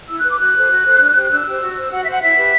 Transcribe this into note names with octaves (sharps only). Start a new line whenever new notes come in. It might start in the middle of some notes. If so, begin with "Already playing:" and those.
E4 E6
B4 F#6
D6
F#4 F#6
A4 C5
F#4
A4 C5
D4
G4 C5
D4 E6
G4 C5
F#4
C5
F#4 F#5
C5 E5
F#5
E4 E5
G4 B4